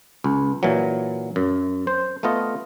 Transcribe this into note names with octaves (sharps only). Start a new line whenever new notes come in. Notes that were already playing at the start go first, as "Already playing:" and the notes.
C#2
A#2 E3 F#3
F#2
C5
A3 B3 F4 D#5